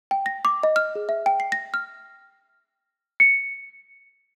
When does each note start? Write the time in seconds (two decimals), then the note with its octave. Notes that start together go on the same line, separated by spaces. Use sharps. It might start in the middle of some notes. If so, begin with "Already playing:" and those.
0.11 G5
0.26 A#6
0.45 D6
0.63 D#5
0.76 F6
0.96 G#4
1.09 E5
1.26 G5
1.40 C7
1.52 A#6
1.74 F6
3.20 C#7